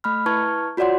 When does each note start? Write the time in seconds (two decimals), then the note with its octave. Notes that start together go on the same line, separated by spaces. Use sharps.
0.04 A3 B5 F6
0.26 E4 B4 A5 C#6 F6 G#6
0.77 F4 F#4 C#5 D5 F#5 C6